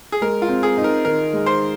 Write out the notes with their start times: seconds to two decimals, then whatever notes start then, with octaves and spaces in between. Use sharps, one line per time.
0.12 G#4
0.21 G#3 A#4
0.42 F4
0.49 C4
0.63 G#4
0.78 D#4
0.84 A#4
1.05 D#3 A#4
1.33 G#3
1.46 C5